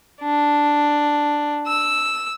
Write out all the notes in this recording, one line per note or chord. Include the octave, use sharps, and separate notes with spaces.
D4
E6